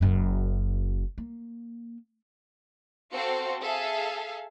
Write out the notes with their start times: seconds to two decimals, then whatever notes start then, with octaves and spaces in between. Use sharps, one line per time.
0.01 F#1 F#2
1.18 A#3
3.13 C4 F#4 A4 C5 F5 C#7
3.62 G#4 A4 E5 F5